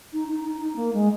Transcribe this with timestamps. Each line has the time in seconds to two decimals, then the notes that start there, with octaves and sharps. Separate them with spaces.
0.13 D#4
0.28 D#4
0.44 D#4
0.61 D#4
0.76 A#3
0.93 G#3